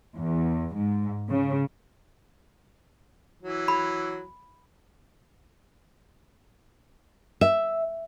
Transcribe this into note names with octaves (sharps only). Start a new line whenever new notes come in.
E2
G#2
C#3
E3 F#3
B5
E5